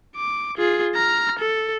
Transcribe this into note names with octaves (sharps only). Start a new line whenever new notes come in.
D6
F4 G#4
A#5 F6
A4